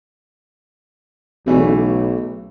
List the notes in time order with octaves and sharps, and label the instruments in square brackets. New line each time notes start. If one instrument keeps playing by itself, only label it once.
[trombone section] B1 [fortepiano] C#3 E3 A3